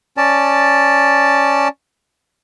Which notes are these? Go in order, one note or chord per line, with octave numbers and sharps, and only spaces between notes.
C#4 D5 A5